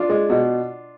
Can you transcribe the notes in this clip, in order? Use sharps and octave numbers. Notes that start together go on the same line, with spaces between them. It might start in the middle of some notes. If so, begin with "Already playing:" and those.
Already playing: D4 F4
G#3
B2